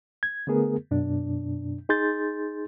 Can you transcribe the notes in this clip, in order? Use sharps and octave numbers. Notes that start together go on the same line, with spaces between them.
G#6
D3 A3 B3 G#4 A#4
F#2 B2 D4
D#4 G#4 C6 G6 A6